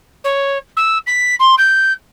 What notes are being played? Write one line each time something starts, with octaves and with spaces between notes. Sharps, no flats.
C#5
E6
B6
C6
G6